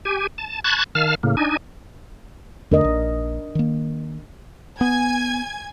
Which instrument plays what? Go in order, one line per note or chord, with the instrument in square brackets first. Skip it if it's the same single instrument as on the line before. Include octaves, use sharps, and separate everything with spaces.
[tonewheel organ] G4 G#5
A5
A5 B5 C#6 F#6 G#6 A6
D#3 F5 A5 F6
A2 C#3 A#3
D4 D#4 G#5
[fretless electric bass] E2 D3 A3 [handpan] D4 A#4 D#5
[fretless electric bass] A#1
D#3 A#3
[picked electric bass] B3 [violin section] G#5 G#6